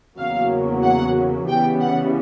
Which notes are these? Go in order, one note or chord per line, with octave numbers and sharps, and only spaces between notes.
E2 C#3 F#3 A#3 F5
F#5
C#3 E3 G3 B3 G5
F#5